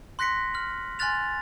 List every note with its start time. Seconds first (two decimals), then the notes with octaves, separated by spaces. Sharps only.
0.19 C6 F#6 A#6 B6 C#7
0.54 F6 F#7
0.99 G#5 C6 F6 F#6 A6 F7